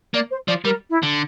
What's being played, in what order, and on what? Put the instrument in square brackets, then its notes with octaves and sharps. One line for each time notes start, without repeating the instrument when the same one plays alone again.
[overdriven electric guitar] A#3 [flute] D5
[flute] C5
[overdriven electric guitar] F3 [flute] D5
[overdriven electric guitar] G3 [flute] A#4
[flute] E4
[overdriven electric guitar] D3